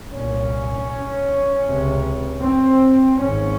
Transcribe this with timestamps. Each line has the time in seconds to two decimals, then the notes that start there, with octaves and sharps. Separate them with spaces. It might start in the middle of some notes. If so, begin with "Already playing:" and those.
0.13 C2 A#2 C#4
1.66 C#2 C3
2.43 C4
3.19 G#1 G#2 C#4